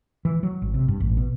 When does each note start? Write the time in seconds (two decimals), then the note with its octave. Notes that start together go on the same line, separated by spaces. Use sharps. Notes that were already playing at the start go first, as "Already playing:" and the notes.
0.25 E3
0.43 F#3
0.62 G#1
0.74 C3
0.88 G2
1.00 A1
1.17 B2